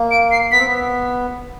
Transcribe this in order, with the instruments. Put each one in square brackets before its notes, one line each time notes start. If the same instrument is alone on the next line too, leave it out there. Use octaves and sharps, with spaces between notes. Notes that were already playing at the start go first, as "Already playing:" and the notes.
Already playing: [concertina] A#3
[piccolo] D7
C7
[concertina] B3 [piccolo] B6
[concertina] C4
B3